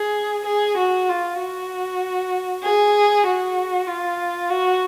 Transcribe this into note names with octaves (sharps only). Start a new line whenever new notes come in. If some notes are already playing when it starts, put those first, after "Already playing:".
Already playing: G#4
G#4
F#4
F4
F#4
G#4
F#4
F4
F#4